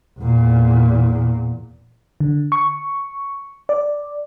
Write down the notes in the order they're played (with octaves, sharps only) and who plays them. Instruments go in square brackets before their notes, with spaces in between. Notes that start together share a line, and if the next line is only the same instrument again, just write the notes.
[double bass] E2 A#2
[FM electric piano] D3
C#6
D5